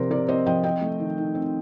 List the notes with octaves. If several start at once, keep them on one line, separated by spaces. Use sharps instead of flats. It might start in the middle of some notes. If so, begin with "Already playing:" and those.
Already playing: C3 F3 C4 A#4 C5 D5
C3 A#4 D5
C4 C5 D#5
F3 D#5 G5
C4 D#5 G5
A3
D#3
D#3
C4